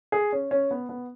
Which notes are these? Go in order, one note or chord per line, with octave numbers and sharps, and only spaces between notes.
G#4
C#4
C#4
B3
B3